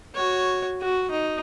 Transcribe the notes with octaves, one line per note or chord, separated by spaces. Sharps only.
F#4 C#5
F#4
D#4